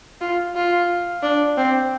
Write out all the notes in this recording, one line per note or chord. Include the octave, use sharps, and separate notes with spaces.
F4
F4
D4
C4